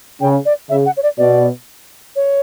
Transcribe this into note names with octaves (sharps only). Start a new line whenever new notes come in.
C#3 G5
D5
C#3 E5
F#5
C#5
D5
B2 D5
C#5